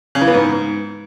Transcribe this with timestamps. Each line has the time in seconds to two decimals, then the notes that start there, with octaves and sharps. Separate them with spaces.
0.15 C#3
0.21 E3
0.27 B3
0.34 G#2